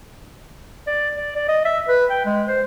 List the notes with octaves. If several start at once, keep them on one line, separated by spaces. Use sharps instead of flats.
D5
D5
D5
D#5
E5
B4
G5
G#3
C5